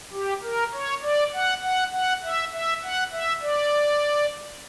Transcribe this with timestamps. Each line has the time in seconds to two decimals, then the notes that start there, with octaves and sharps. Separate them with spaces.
0.13 G4
0.43 A#4
0.73 C#5
1.03 D5
1.33 F#5
1.63 F#5
1.92 F#5
2.23 E5
2.53 E5
2.83 F#5
3.12 E5
3.42 D5